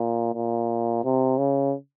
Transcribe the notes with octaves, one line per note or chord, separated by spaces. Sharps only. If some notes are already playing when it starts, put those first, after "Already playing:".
Already playing: A#2
A#2
C3
C#3